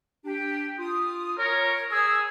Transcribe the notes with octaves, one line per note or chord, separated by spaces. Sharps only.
D4 G4
F4 D#6
A#4 C#5
G#4 E6